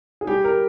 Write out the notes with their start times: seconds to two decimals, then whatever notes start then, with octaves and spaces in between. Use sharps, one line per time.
0.21 G#4
0.27 G3 G4
0.44 A#4